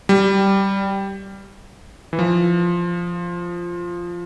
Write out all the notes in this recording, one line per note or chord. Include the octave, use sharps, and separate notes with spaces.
G3
E3
F3